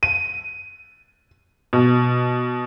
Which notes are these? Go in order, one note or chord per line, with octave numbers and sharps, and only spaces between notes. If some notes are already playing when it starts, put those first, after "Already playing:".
D#7
B2